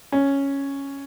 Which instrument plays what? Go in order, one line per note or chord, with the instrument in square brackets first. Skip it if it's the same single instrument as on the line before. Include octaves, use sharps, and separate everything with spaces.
[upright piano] C#4